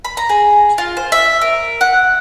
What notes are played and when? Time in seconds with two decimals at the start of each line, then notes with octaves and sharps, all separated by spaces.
0.05 B5
0.17 A#5
0.29 G#4
0.78 F4
0.97 C5
1.12 E5
1.42 A#4
1.81 F#5